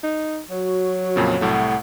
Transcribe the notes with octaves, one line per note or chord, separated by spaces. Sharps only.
D#4
F#3 F#4
F2 A#2 C#3
C2 A2 A3 F#5